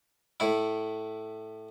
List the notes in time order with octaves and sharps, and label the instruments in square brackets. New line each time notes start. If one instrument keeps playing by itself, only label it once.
[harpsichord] A2 E4